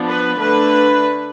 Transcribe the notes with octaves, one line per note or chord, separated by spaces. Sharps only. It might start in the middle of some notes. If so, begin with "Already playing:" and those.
Already playing: F3 B3 D4
B4
D3 A3 D4 B4